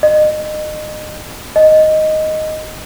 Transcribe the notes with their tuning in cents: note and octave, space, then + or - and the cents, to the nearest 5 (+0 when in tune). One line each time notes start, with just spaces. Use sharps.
D#5 -30
D#5 +0